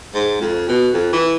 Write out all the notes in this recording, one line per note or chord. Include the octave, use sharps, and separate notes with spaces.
G#2
F2
B2
F2
E3